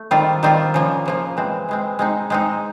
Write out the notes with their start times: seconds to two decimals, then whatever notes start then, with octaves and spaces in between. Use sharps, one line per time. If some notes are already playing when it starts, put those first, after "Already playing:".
Already playing: A3
0.11 D#3 G3 C4 F4
0.43 D#3 G3 C4 F4
0.74 C#3 F3 A#3
1.06 C#3 F3 A#3
1.37 E3 G#3 C4
1.69 E3 G#3 C4
1.99 G#3 C4 D#4
2.30 G#3 C4 D#4